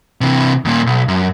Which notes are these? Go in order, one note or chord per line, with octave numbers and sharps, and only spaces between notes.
C3 E3
D#2 A#2
B1
F#2